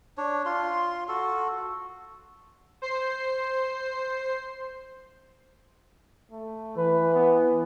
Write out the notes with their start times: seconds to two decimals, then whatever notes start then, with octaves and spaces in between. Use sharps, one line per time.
0.18 D4 C#5
0.45 F4 C6
1.08 F#4 A4
2.82 C5 C7
6.31 A3
6.77 E3 B4
7.14 B3